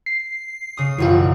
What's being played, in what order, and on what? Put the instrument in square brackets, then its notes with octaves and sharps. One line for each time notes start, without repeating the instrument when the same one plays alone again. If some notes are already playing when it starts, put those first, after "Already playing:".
[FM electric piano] C7
[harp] C#3 D#6
[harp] E1 A#1 F#2 [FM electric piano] E3 F4